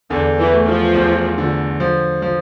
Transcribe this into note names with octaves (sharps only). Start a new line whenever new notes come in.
E2 D3
E3
A3
F3
E2
D3
F3
F3